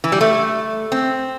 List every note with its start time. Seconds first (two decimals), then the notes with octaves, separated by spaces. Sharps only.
0.04 E3
0.12 G3
0.21 A3
0.92 C4